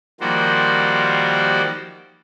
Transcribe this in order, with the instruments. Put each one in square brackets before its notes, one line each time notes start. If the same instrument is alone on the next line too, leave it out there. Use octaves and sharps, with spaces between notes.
[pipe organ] D#3 F3 G3 A#3 F#4 C5